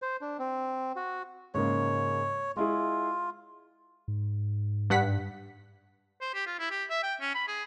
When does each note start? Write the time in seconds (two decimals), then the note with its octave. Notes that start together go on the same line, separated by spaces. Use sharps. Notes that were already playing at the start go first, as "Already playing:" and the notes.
0.02 C5
0.21 D4
0.39 C4
0.96 F#4
1.54 G#2 C#3 A#3 C#5
2.56 G#3 E4 F4 G#4
4.08 G#2
4.90 G2 F#5 B6
6.21 C5
6.34 G4
6.46 F4
6.59 E4
6.71 G4
6.90 E5
7.03 G5
7.21 C#4
7.35 B5
7.48 G#4